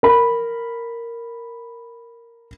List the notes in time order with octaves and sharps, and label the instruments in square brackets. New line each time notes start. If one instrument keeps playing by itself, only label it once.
[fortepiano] A#4 B5